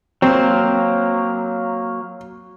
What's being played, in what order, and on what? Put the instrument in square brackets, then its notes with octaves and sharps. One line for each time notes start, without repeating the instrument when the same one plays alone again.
[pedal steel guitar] F#3 A#3 [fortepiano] C4